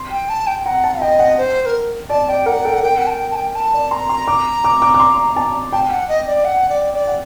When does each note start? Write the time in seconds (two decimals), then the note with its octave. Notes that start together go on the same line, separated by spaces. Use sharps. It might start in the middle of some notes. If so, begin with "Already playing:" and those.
Already playing: C6
0.11 G5
0.29 A5
0.47 G5
0.65 F#5 A#5
0.84 A5
1.01 D#5 G5
1.19 F#5
1.38 C5
1.62 C5
1.66 A#4
2.10 D5 A5
2.28 D5 G5
2.46 A#4 F#5
2.65 A4 G5
2.74 F#5
2.83 A#4 G5
2.97 F#5
3.06 A5
3.10 G5
3.31 A5
3.36 G5
3.55 A5
3.74 D5
3.91 A#5 C6
4.09 C6
4.27 D6
4.64 D6
4.82 D6
4.94 D6
5.00 C6
5.36 A5
5.72 G5 A5
5.91 F#5
6.09 D#5
6.27 D5
6.45 F#5
6.69 D5
6.94 D5
7.07 F#5